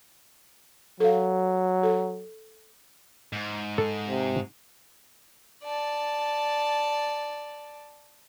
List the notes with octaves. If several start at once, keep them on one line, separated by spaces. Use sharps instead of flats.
F#3 A4 F5
A4
G#2
A4
C3
D5 A5